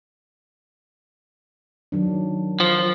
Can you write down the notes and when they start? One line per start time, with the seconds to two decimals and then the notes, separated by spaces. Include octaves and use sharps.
1.92 D#3 F#3 D4
2.60 F3